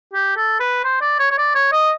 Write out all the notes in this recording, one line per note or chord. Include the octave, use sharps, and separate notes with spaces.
G4
A4
B4
C5
D5
C#5
C#5
D5
C#5
D#5